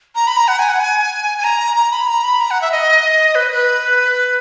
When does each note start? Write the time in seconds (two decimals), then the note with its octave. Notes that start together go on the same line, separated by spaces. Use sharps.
0.15 A#5
0.27 B5
0.37 A#5
0.48 F#5
0.59 G#5
0.69 F#5
0.80 G#5
1.38 G#5
1.44 A#5
1.76 A#5
1.92 B5
2.07 A#5
2.24 B5
2.40 A#5
2.51 F#5
2.62 E5
2.72 D#5
3.35 B4
3.52 B4